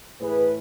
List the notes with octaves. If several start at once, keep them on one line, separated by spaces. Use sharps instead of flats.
A2 E3 A3 G#4 B4